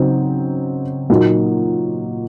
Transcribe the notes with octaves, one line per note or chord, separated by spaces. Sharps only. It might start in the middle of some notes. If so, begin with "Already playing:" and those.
Already playing: C#3 F#3 C4 D#4
A#2 F#3 A#3 D#4